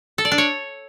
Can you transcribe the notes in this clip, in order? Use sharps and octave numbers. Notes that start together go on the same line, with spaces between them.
A4
D5
D4
C#5